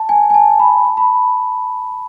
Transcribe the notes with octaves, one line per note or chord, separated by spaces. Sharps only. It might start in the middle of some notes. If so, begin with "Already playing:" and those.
Already playing: A5
G#5
G#5
A5
B5
A5
B5